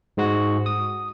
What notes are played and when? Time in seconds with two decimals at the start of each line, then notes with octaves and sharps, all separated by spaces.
0.17 G#2 G#3 F#4
0.66 D#6